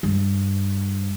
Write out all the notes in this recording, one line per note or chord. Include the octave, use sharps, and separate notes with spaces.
G2